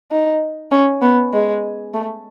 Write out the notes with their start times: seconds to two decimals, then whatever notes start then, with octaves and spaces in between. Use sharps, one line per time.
0.11 D#4
0.71 C#4
1.02 B3
1.33 G#3
1.94 A3